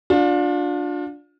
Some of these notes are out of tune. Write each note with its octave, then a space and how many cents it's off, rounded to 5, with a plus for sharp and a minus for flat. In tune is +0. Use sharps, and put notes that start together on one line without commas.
D4 +0 F4 +35